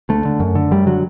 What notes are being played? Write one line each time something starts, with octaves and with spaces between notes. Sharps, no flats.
D2 A3
D3
F#2
D3
F#2 G3
D3 F#3